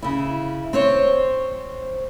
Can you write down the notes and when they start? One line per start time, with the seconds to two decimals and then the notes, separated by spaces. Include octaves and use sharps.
0.02 C#3 E4
0.73 C4 C5 C#5